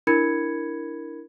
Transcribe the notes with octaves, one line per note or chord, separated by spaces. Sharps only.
D4 E4 A#4 B5 G#6 C#7